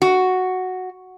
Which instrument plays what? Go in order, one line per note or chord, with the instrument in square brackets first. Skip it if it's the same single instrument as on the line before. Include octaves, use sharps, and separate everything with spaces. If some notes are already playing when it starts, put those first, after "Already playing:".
[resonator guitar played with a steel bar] F#4